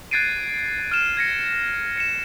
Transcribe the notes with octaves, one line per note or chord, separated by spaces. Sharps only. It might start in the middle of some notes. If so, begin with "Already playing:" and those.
F#6 G#6 A6 C7 D7 D#7
F6 E7
G#6 A#6 C#7
C#7 E7